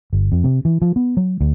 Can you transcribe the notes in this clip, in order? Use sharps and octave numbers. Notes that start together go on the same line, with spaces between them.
G1
F2
C3
E3
F3
B3
F#3
D2